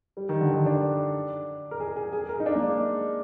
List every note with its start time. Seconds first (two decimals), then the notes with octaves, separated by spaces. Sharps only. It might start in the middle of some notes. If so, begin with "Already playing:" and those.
0.17 G3
0.29 D#3
0.41 D3
0.54 D#3
0.66 D4
1.71 A#4
1.80 G#4
1.96 G#4
2.13 G#4
2.23 G#4
2.29 A#4
2.40 D#4
2.46 D4
2.55 A#3
2.62 G#3